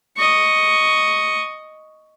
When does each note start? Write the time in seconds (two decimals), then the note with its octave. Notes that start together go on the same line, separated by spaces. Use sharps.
0.17 D#5 C#6